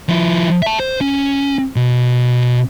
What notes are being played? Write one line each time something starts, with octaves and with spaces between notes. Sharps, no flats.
F3 E4
E5 A5
C5
C#4
B2